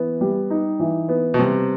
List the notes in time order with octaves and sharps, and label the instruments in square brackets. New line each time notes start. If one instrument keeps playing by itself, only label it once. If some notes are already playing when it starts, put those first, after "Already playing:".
Already playing: [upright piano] E3 B3
G3
D#4
E3
B3
[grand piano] B2
[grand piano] C3 [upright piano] G3